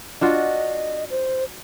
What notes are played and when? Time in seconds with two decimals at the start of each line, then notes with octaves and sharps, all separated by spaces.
0.21 D4 F4 F#4 D#5
1.10 C5